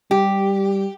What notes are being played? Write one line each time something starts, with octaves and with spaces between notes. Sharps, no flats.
G3 G4